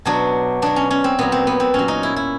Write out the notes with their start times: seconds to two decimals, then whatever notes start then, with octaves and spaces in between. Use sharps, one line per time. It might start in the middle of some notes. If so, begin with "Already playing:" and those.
0.05 B2 F#3 D4
0.62 B2 F#3 D4
0.76 C#4
0.91 C#4
1.04 C4
1.19 A#2 F#3 B3
1.32 C4
1.47 B3
1.60 C4
1.74 A#2 F#3 C#4
1.88 D#4
2.03 E4
2.16 E4